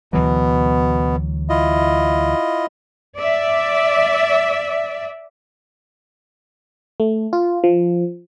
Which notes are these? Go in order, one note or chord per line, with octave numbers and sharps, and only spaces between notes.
D2 B2 E3 F#3 B3
E4 F4 D#5
D5 E5
A3
F4
F3